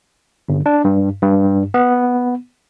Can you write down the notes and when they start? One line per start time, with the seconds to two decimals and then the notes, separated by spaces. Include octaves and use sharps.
0.49 G1
0.66 D4
0.84 G2
1.23 G2
1.74 B3